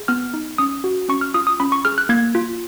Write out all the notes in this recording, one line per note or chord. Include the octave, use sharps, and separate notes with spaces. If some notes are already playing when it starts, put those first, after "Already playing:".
Already playing: G#4
B3 F6
D#4
C#4 D#6
F#4
C#4 C#6
F6
F4 D#6
D#6
C#4 B5
C#6
G#4 F6
F#6
A#3 G#6
F4